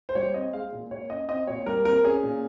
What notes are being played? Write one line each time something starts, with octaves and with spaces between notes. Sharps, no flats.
C5
G3 C#5
C4 D#5
G#3 F5
A#2
A#3 C#5
C#4 D#5
C4 D#5
A#2 C#5
G3 A#4
C4 A#4
C#4 G#4
A#2